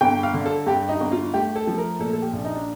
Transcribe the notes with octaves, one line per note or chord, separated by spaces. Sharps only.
G1 G5
F5
D3
A4
G2 G4
D#4
G1
F4
A3 G4
A4
F3
A#4
A#2 A4
A4
G4
A#1
D#4
D4